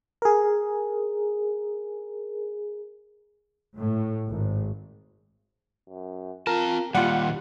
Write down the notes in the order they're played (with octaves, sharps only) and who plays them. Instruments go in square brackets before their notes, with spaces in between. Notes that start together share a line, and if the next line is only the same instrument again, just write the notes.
[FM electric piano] G#4 A#4
[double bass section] A2
G#1
[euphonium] F#2
[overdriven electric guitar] C4 A5 [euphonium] F4 [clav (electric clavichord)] A#4
[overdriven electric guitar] D#2 A#2 [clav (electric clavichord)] G3 F4 [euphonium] G4 [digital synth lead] F#5